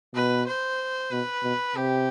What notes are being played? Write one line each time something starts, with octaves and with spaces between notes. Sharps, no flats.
B2 B4
C5
B2 B4
B2
C3 G4